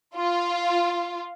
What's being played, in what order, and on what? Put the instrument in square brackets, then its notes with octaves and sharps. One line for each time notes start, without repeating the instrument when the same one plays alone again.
[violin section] F4